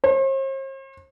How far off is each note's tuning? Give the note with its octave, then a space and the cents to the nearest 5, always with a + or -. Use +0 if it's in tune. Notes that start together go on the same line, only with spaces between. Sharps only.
C5 +45